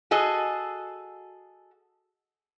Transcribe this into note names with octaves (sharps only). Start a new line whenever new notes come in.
F#4 G#4 A4 D#5